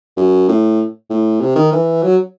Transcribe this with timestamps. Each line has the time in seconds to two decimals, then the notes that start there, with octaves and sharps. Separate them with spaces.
0.17 F#2
0.48 A2
1.10 A2
1.41 C3
1.56 D#3
1.72 E3
2.03 F#3